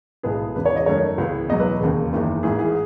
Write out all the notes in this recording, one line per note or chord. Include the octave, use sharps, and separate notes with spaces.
B1 A2 G#3 B3 G#4
E1 E2 C#3 B4
C#5
D#5
F#2 D#3 A3 C#5
C#2 C#3 E3 B3
E2 B2 F#3 D#5
B4
E1 D#2 C#3
F#1 E2 D#3
A1 G#2 E3 G#4
G#4